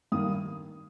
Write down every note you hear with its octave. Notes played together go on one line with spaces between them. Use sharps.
G2 D#3 A#3 D#6